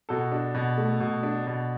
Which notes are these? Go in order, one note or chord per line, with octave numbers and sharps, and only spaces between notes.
B2 F#4 A4
D4
B2
A3
B2
D4
B2